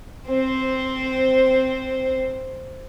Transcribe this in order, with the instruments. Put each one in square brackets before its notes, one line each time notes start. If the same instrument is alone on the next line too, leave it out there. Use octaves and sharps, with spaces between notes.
[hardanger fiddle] C4 C5